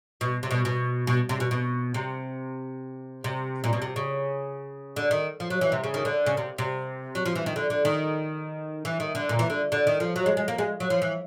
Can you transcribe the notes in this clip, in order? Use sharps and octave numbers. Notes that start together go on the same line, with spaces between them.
B2
C3
B2
B2
B2
C3
B2
B2
C3
C3
A#2
B2
C3
C#3
D3
D#3
F3
F#3
E3
C3
C#3
D#3
D3
C#3
C3
C3
F#3
F3
E3
D#3
D3
D3
D#3
E3
D#3
D3
A#2
E3
D3
D3
D#3
F3
F#3
G#3
G#3
A#3
G#3
F#3
F3
E3